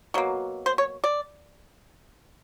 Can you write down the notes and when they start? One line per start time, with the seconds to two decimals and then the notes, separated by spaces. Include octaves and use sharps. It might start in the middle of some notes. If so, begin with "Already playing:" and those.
0.14 B2 F#3 A#3
0.66 C5
0.78 C#5
1.04 D5